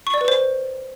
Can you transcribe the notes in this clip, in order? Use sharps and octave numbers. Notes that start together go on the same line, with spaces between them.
C#6
D5
B4
C5